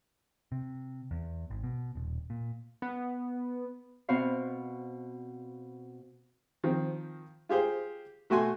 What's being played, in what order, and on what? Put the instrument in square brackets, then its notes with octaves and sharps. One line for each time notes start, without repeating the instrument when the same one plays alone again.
[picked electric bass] C3
E2
G#1
B2
D#1
A#2
[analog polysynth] B3
[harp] B2 B3 C4 F#4 C5 F5
[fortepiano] D#3 F3 C4
F4 G4 G#4 C5
B2 A3 F#4 G#5 C6